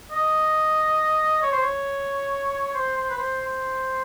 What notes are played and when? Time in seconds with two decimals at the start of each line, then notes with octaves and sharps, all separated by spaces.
0.11 D#5
1.42 C#5
1.52 C5
1.62 C#5
2.74 C5
2.96 C5
3.10 B4
3.18 C5
3.41 C5